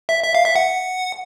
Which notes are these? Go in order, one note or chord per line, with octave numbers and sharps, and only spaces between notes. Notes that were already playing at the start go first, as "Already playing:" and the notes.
E5
E5
F5
E5
F#5